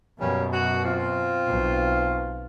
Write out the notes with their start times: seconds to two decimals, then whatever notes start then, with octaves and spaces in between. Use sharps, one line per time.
0.20 F#2 B2 G3 A#3 C#4
0.52 F#4
0.84 C4 F4
1.47 B1